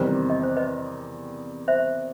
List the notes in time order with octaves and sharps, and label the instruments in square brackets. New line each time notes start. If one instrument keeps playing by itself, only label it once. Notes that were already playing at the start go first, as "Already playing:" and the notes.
Already playing: [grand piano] E2 D#3 G3 C4 [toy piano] C5
[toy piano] D#5
C5
B4 D#5
C5 E5